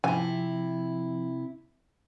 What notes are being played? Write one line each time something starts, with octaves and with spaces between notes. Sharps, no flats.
C3 F3 E4 G#5